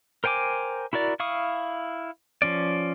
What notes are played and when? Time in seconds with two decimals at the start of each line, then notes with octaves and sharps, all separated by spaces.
0.24 A#4 C5 G5 G#5 D6
0.93 E4 F#4 A#4 D5
1.20 E4 F5 C#6 D#6
2.42 F3 C#4 D5